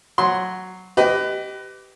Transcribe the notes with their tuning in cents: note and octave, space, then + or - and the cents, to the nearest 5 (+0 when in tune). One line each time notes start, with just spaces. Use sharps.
F#3 +0 C6 +5
G4 -15 B4 +20 D#5 +0